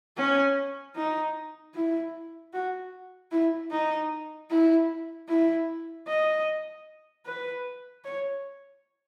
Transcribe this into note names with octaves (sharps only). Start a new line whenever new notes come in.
C#4
D#4
E4
F#4
E4
D#4
E4
E4
D#5
B4
C#5